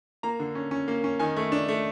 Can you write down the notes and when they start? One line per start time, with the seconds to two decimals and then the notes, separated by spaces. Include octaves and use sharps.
0.23 A#3 A#5
0.40 D3
0.55 C#4
0.71 C#4
0.88 A#3
1.04 C#4
1.19 D#3 G#5
1.36 A3
1.52 D4
1.68 A3